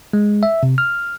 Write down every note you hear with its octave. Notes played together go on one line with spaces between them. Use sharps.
G#3
E5
C3
F6